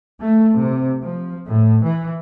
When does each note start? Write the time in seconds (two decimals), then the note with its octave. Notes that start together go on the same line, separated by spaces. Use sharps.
0.20 A3
0.56 C3
1.03 F3
1.47 A2
1.84 E3